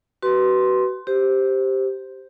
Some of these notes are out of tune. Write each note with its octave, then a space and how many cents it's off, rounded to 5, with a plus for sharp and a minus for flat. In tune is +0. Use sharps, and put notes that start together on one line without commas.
F#4 +35 B4 +0 C6 +0
G4 +0 C5 +0